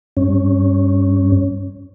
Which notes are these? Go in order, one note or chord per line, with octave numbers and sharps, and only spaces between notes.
G2 C#4